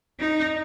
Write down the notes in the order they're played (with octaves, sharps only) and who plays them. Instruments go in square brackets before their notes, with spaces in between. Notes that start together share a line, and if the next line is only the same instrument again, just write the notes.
[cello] D#4